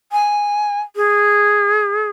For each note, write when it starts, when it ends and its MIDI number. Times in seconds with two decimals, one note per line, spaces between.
0.12 0.80 80
0.96 2.10 68